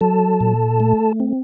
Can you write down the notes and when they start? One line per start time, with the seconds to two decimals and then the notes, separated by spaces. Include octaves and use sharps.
0.01 F#3 A4 A5
0.40 A#2
0.80 A3
1.20 C4